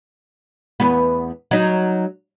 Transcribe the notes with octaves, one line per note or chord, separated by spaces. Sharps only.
E2 B3
F#3 D#4